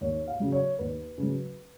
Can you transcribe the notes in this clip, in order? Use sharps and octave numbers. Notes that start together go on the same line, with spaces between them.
D#2 C#5
F5
C#3 F#3
C#5
D#2 B4
C#3 F#3